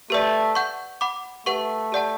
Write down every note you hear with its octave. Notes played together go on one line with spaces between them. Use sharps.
A3 G4 B4 D5
F#5 C#6 G6
F#5 B5 D6
A3 G4 B4 F#5 C#6
G4 D5 F#5 A5